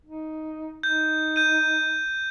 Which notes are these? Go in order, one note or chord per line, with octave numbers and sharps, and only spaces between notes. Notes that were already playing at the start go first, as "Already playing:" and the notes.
D#4
D#4 G6
G6 D#7